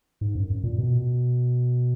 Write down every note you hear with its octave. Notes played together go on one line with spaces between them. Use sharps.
G#2
F#2
F#2
A#2
B2